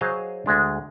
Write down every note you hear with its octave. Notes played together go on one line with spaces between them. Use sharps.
F#3 G#4 C5 D#5 F5
D2 G#3 D4